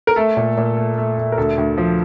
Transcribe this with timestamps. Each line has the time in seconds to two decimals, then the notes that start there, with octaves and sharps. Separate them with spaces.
0.07 A#4
0.16 A3 A4
0.37 A#2
0.57 A#2
0.77 A3
0.97 A3
1.17 A3
1.32 A#4
1.38 D2 A4
1.58 D2
1.78 F3